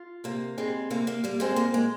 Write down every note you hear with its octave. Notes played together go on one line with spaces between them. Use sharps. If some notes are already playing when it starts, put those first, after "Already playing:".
Already playing: F4
C3 A#3
G3 G#3 C4
C3 A#3
A#3
G3 A#3
G#3 C4
A#2 A#3
G#3